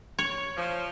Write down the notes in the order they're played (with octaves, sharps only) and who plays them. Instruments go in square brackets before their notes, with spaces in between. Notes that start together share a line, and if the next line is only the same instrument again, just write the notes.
[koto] C#5
[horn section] F3